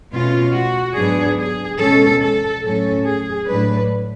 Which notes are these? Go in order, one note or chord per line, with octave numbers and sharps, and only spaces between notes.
B2 A3 C#4 F4
F#4
G#2 F#3 B3 D4 G#4
G#4
B2 G#3 C#4 A4
A4
A2 F#3 C#4 A4
G#4
A2 F#3 A3 D4 B4